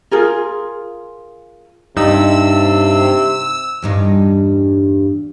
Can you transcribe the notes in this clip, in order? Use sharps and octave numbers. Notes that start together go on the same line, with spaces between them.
F4 G#4 A#4
G2 C3 D#4 E6
E2 G2 D#4